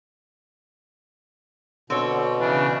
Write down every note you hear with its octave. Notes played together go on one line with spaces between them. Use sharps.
B2 D3 C4 C#5
C#3 E3 D4